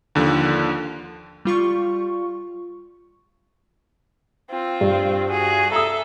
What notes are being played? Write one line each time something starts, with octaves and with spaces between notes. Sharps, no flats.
D#2 D3 F3
G3 F4 C#6
C4 F4
G2
F#4 G#4
A4 E5 A#5 D#6